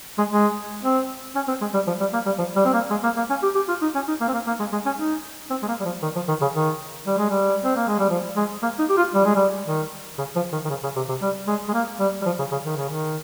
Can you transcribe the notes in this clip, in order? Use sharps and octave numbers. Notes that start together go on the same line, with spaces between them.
G#3
G#3
C4
C#4
C4
G#3
G3
F3
G3
A#3
G3
F3
G3
C4
A#3
G#3
A#3
A#3
C#4
G4
G4
F4
D#4
C#4
D#4
A#3
C4
A#3
A#3
G#3
G#3
C#4
D#4
C4
G#3
A#3
G3
F3
D#3
F3
D#3
C#3
D#3
G3
G#3
G3
C4
A#3
G#3
G3
F3
G#3
A#3
D#4
G4
F4
G3
G#3
G3
D#3
C#3
F3
D#3
D#3
C#3
C#3
C3
C3
G3
G#3
G#3
A#3
G3
G3
F3
C#3
C#3
D#3
C#3
D#3